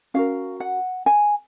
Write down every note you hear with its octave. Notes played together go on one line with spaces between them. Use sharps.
C#4 F#4 A#4 F5
F#5
G#5